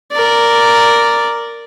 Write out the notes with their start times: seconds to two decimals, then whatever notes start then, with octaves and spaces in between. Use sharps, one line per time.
0.12 A#4 D5